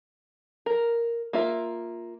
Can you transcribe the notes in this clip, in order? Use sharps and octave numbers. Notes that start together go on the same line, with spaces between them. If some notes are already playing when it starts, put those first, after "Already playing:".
A#4
A#3 F4 E5